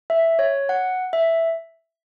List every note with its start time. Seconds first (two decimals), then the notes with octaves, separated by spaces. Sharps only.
0.10 E5
0.39 C#5
0.69 F#5
1.13 E5